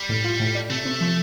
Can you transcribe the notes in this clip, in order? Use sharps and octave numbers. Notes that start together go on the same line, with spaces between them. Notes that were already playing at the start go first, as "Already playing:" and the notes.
Already playing: G3
A2
F4
A2
D4
C3 A3
C3
F3